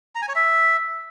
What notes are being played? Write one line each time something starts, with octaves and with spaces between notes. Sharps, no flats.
A#5
G#5
C#5
E5